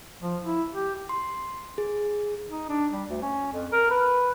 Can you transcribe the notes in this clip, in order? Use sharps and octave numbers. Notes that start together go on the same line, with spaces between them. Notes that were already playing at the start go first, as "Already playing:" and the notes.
F3
E4
G4
C6
G#4
D#4
D4
G3
D2
C#4
F2
A#4
B4